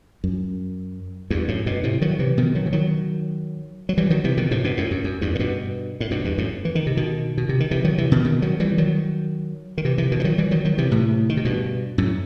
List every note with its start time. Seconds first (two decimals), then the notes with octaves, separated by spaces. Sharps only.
0.24 F#2
1.30 E2 G2
1.48 F#2 A2
1.66 G2 B2
1.83 A2 C3
2.01 D#3 F#3
2.19 C3 E3
2.37 B2 D#3
2.55 D#3 F#3
2.66 E3
2.73 D#3 F#3
3.89 F#3
3.97 E3 G3
4.10 D#3 F#3
4.24 C3 E3
4.37 B2 D#3
4.51 A2 C3
4.64 G2 B2
4.77 F#2 A2
4.91 F#2
5.04 F#2
5.21 E2 G2
5.35 A2
5.39 G2 B2
6.00 A2
6.11 G2 B2
6.24 E2 G2
6.38 F#2 A2
6.65 E3
6.75 D#3
6.87 C3
6.97 B2 D#3
7.38 B2
7.49 C3
7.60 D#3
7.71 C3 E3
7.84 D#3 F#3
7.98 C3 E3
8.12 B2 D#3
8.25 B2 D#3
8.42 D#3 F#3
8.60 E3 G3
8.78 D#3 F#3
9.78 D#3
9.85 C3 E3
9.98 C3 E3
10.12 B2 D#3
10.20 E3
10.24 D#3 F#3
10.38 E3 G3
10.51 D#3 F#3
10.65 D#3 F#3
10.78 C3 E3
10.91 A2 C3
11.29 D#3
11.37 C3
11.45 G2 B2
11.98 F#2 A2